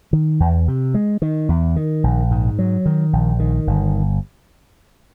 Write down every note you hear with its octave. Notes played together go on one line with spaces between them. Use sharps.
D#3
E2
C3
G#3
D#3
E2
D#3
A#1
G#2
F#3
D#3
A#1
D#3
G1